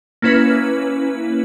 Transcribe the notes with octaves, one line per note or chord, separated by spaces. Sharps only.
A#3 C#4 E4 B4